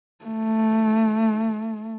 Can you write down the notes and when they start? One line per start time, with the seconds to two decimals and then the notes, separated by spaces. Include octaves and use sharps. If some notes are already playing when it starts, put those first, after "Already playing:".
0.25 A3